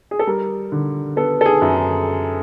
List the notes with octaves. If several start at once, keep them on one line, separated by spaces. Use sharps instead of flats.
G#4
A4
G3 A#4
D3
B3 A4
A4
G#4
F#2